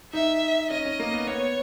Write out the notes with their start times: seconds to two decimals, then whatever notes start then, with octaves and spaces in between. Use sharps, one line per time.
0.13 D#4 E5
0.70 C#4 D#5
0.85 C#4
1.00 A#3
1.13 B3
1.27 B3 C#5